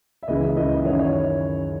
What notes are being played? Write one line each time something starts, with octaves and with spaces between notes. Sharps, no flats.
E5
C#2 C#3 E3 D#5
E5
C#2 C#3 E3 D#5
D#5
F#2 D#3 C#5
C#5